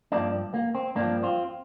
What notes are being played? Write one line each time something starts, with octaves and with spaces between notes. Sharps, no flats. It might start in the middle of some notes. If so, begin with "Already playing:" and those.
G2 F3 A#3 D4
A#3
C4
G2 F3 A#3 D4
C4 F4